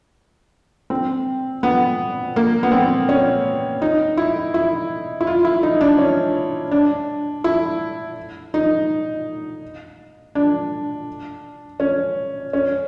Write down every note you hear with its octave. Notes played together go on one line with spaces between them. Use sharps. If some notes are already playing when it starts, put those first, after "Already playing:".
C4
B3
A#3
B3
C4
C#4
D#4
E4
E4
E4
F4
E4
D#4
D4
C#4
D4
E4
D#4
D4
C#4
C#4